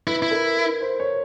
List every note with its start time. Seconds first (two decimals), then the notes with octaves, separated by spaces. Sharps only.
0.07 E4 B4
0.22 E4
0.31 A#4
0.57 B4
0.81 C5
1.00 C#5